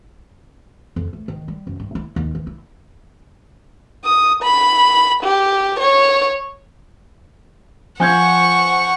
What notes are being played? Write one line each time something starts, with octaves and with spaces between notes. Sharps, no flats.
F2
A3
D#3
G3
F#2
G2
E4
D#2
E3
E4
D#6
B5
G4
C#5
F3 F#5 G#5 C#6 G6 G#6